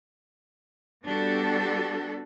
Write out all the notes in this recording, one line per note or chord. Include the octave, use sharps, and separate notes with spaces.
G3 B3 D4 F#4 G4 A4